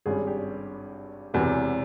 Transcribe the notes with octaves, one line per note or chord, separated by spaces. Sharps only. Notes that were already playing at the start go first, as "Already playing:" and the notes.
G#1 G2 G3 C#4 G#4
G4
E1 E2 C3 E3